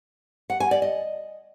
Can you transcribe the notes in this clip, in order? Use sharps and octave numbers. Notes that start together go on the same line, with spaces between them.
F#5
G#5
D5
D#5